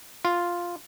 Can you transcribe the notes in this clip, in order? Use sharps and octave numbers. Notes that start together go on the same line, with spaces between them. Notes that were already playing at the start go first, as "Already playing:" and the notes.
F4